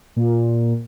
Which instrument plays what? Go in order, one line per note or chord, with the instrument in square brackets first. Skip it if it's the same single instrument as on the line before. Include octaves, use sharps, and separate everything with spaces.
[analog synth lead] A#2